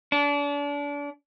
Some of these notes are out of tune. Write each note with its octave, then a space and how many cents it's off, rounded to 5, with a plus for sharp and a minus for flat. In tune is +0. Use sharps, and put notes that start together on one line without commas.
D4 -35